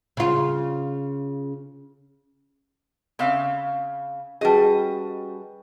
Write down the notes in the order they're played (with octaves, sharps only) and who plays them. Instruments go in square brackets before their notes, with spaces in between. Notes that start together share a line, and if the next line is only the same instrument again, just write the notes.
[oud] C#3 F4
[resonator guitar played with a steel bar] C#3 C4 E5 F5
[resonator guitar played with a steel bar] G3 D#5 [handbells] C#4 F#4 B4 [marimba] G#4 A5